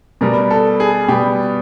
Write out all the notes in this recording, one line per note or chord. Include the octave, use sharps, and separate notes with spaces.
B2 G3 B3 A#4
A4
G#4
B2 G3 B3 G4